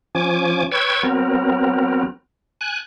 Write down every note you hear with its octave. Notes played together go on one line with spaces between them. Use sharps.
F3 C#4 G#5 D6
B4 C#5 G5 C#6 E6 G#6
F#3 B3 C4 A#4
G#5 F#6